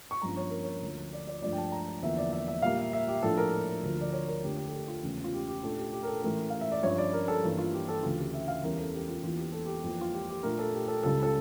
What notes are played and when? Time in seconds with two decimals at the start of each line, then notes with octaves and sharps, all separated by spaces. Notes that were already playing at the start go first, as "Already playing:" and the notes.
0.11 C#6
0.22 G2 F3 A#3 C#4 A#5
0.37 C#5
0.50 A#4
0.64 C#5
0.82 D2 D3 F3
1.13 D5
1.27 D5
1.42 G2 F3 A3 D4 D5
1.52 G5
1.58 A5
1.72 A#5
2.02 E2 D3 F3 A#3 E5
2.18 D5
2.32 E5
2.48 E5
2.62 A#2 G3 A#3 F5
2.78 E5
2.93 E5
3.08 G4
3.23 A2 F3 A#3 D4 A4
3.37 A#4
3.83 D2 D3 F3
4.01 D5
4.13 C#5
4.28 A#4
4.43 F2 D3 A3 D4 G4
4.57 G4
4.67 A4
4.73 G4
4.88 F4
5.03 E2 C#3 E3 A3 C#4
5.24 F4
5.33 G4
5.48 G4
5.63 A#2 A3 D4 A4
5.78 G4
5.93 G4
6.03 A#4
6.07 A4
6.23 A2 E3 A3 C#4 A#4
6.50 F5
6.61 E5
6.72 D5
6.83 G2 F3 C#4 C#5
6.98 D5
7.13 A#4
7.28 A4
7.44 G2 E3 A#3
7.58 F4
7.74 G4
7.89 A4
8.03 D2 C#3 E3 F4
8.18 G4
8.34 E5
8.48 F5
8.63 E2 E3 G3 C#4 A#4
8.79 A4
8.94 G4
9.08 F4
9.23 E2 E3 A#3 F4
9.39 G4
9.53 A4
9.66 G4
9.83 F2 E3 A#3
10.01 F4
10.13 G4
10.29 G4
10.43 A#2 A3 D4 A#4
10.59 A4
10.73 G4
10.88 A4
11.03 C#2 C#3 G3 A4
11.23 A4